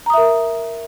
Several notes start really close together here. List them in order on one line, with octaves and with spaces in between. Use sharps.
A#5 D#6 E5 A#4